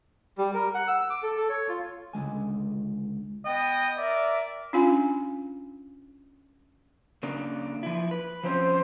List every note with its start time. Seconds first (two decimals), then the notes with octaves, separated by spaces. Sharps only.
0.38 G3
0.54 A#4
0.75 F#5
0.88 E6
1.10 D6
1.23 A4
1.37 A4
1.49 C#5
1.69 F4
2.13 C#2 D3 G#3 G#5
3.46 B3 D#5 G5
3.98 A#4 D5 E5
4.73 C#4 D4 F4 F5 G#5
7.23 C#3 A#3 D4
7.83 F3 E4
8.11 B4
8.43 F3 C4 C#4 C5